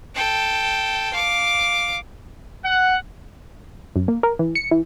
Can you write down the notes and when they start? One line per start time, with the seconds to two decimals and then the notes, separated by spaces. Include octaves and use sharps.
0.15 A4 G5
1.13 F5 D6
2.64 F#5
3.96 F#2
4.08 A#3
4.23 A#4
4.39 E3
4.55 C#7
4.71 E3